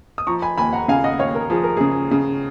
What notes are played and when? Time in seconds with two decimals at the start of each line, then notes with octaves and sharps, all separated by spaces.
0.18 D#6
0.27 F3 A#5 C#6
0.42 G#5 B5
0.58 D#2 G#5 B5
0.73 F#5 A#5
0.88 C#3 F5 G#5
1.04 D#5 F#5
1.19 D#2 C#5 F5
1.35 A#4
1.50 F3 G#4
1.64 A#4
1.77 C#3 G#4
2.11 C#3